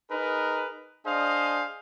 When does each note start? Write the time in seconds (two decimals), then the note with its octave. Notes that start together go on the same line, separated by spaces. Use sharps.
0.11 D#4 G#4 A#4 B4
1.06 D4 G#4 C5 D#5 F5